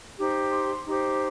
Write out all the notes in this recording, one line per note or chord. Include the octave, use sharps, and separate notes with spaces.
D#4 G4 C5
C6
D#4 G4 C5